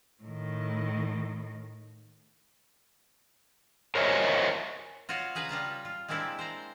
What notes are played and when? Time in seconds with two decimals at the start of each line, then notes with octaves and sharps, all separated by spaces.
0.23 A2 D#3
3.95 A#4 C5 C#5 D#5 E5 G#5
5.09 F4 F#4 C#5 D#5 F5
5.35 C#3 G#4 B4 A#5
5.49 G3 F4 A5 A#5
5.85 F4
6.08 G#3 A#3 C4 D4 E4 G4
6.39 C5 D5 A#5